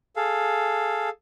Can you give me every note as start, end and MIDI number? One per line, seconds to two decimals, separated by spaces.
0.16 1.09 68
0.16 1.09 69
0.16 1.09 77